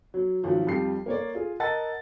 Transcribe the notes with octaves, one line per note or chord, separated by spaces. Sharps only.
F#3
G#1 F3 F#3
F2 G3 F4 G4 C7
A#3 C#5 D5
F4 G#4
A#4 D#5 F#5 A5 E6 A6